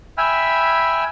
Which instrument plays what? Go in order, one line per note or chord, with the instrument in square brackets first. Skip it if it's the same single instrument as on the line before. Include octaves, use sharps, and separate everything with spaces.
[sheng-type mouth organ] E5 G5 G#5 B5 E6 F6